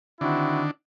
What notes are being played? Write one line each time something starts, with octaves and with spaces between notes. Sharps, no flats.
D3 D#3 C4 D4 E4 F#4